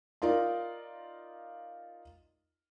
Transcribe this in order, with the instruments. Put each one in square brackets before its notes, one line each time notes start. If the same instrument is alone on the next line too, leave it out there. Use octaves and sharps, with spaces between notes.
[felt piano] D#4 F4 A#4 D5